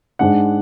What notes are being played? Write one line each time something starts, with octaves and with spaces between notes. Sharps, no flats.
G#2 G#3 D4 F#5